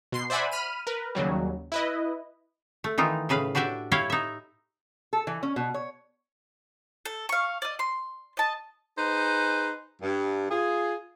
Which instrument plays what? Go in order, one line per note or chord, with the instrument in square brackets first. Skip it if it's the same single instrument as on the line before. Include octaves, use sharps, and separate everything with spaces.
[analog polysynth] B2 C6 C7
C5 D5 E5 F#5 G#5 B5
B5 F6 D#7
A#4 B4
D#2 C#3 F#3 G3
E4 B4 D#5
[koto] A3
D#3 E3 D#4 F4
A2 C#3 B4 F5
D4 F#4 G4 D5 E5
E4 G4 C#5 F5 G5
D#4 E5
[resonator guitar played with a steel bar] A4
E3
C#4
B2
C#5
[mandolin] A4
F5 C#6
D5 D#5
C6
D#5 A5
[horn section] D#4 G#4 B4 C5
G2
F4 G#4